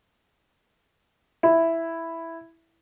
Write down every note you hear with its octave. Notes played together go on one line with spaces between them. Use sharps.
E4